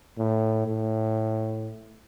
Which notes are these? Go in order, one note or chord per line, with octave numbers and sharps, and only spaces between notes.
A2
A2